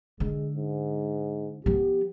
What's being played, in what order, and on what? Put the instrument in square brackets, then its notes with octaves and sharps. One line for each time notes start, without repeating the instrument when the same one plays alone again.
[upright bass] D3 [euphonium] G#3
[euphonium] G#2
[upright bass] F3 B3 [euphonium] G4